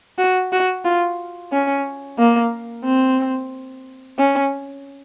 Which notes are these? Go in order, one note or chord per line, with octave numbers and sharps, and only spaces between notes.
F#4
F#4
F4
C#4
A#3
C4
C#4